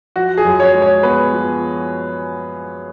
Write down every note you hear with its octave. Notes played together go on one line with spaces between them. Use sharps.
F3 F#4
G#4
F#2
C#5
G#3
C#5
B3 B4
F3